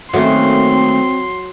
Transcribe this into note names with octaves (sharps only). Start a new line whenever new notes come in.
D#3 F#3 A3 A#3 C4 C#4 F#4 C6